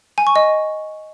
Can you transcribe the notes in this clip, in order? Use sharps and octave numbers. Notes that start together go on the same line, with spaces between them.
G#5
C#6
D#5